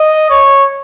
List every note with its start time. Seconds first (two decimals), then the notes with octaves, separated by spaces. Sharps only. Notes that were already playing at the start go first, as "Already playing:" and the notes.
Already playing: D#5
0.29 C#5